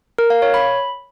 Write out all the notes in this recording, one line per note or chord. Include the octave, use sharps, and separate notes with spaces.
A#4
F5
C#5
B5